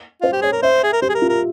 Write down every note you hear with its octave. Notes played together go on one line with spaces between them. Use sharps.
F4 C5
G4
G#4 C#5
A#4
C5 E5
G#4
A#4
G4 C5
G#4
A#4
F4
A#4